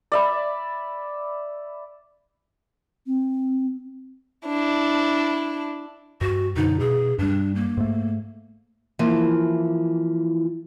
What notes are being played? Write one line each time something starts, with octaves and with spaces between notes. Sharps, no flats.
D5 E5 B5
C4
D4 E4
G2 F#4
F#2 B2 D3 D#4
B2 G#4
G2 G3 D4
A#3
G#2 A3
E3 F3 A#3 E4